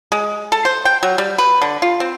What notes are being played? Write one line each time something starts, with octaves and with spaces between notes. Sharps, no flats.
G#3
A4
C5
G5
F#3
G3
B4
D3
F4
C4